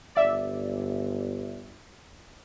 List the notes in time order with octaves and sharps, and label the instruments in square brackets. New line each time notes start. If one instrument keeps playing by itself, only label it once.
[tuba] G1 [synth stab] D5 E5